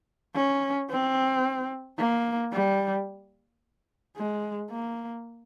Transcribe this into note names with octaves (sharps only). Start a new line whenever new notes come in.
C#4
C4
A#3
G3
G#3
A#3